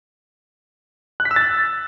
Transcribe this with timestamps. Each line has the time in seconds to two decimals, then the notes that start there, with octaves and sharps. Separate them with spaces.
1.20 F#6
1.25 B6
1.31 E6
1.36 A6